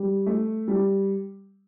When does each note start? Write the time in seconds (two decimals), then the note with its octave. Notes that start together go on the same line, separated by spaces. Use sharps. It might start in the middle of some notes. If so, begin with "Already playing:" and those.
Already playing: G3
0.26 A3
0.68 G3